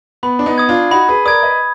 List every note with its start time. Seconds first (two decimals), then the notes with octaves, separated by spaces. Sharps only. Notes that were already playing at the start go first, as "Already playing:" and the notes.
0.23 B3 B5
0.39 D4
0.46 B3 D#4
0.58 D#6 G#6
0.69 D4 F4
0.91 D#4 F#4 B5
1.08 G#4 B4
1.25 A#4 D5 D#6 G#6
1.43 B4 D#5